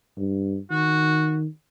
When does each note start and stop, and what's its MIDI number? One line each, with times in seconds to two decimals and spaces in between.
0.18 0.58 43
0.71 1.47 51
0.71 1.38 66